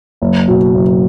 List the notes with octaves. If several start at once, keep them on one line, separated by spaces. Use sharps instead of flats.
F#1
B2
F#1